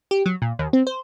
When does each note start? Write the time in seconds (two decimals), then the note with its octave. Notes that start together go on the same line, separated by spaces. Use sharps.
0.11 G4
0.26 F#3
0.42 A#2
0.59 D#2
0.73 C4
0.87 C5